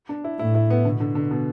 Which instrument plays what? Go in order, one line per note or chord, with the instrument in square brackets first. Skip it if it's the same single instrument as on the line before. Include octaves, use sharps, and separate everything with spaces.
[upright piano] D4
E4
[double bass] A2 [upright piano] E4
[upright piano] E4
B3
[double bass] B2 [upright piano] D3
[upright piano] D3
D3
B2